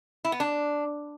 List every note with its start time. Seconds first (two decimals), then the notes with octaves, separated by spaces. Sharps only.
0.25 E4
0.32 B3
0.40 D4